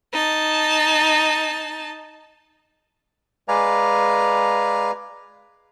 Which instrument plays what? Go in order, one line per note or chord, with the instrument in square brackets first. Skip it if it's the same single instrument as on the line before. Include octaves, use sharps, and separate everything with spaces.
[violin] D#4 A5
[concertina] G#3 B4 D5 F5 G#5 A#5